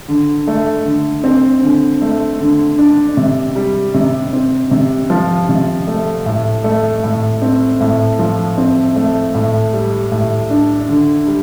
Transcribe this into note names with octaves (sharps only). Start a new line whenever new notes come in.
D3
A3
D3
C4
D3
A3
D3
D4
C3
G3
C3
C4
C3
F3
C3
A3
A2
A3
A2
C4
A2
F3
C4
A3
A2
G3
A2
D4
D3
G3